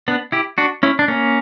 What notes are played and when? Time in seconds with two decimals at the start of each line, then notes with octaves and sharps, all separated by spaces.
0.08 B3 D4
0.32 E4 G4
0.58 D4 F#4
0.83 C#4 E4
0.99 D4
1.08 A#3 C#4